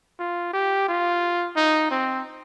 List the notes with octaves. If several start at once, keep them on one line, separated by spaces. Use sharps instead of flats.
F4
G4
F4
D#4
C4